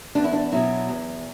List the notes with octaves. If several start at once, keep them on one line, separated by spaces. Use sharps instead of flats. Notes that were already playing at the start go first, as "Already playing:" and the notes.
E2 D4
E4
D4
B2 F#3 E4
E2